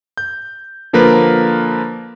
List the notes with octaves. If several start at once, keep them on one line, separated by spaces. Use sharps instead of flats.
G6
D3 F3 A#3 A#4 B4